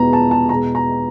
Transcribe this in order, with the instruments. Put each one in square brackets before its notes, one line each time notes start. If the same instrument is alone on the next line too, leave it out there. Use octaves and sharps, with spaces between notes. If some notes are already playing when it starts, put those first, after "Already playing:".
Already playing: [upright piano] E2 B2 G#3 B3 A#5
A5
A5
E2 B2 G#3 B3 A#5
A#5